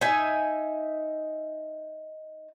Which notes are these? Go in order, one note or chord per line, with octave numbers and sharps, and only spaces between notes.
D#4 E5 G#5